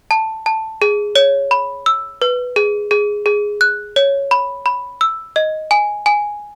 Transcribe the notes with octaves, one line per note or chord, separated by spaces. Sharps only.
A5
A5
G#4
C#5
B5
E6
B4
G#4
G#4
G#4
F#6
C#5
B5
B5
E6
D#5
G#5
G#5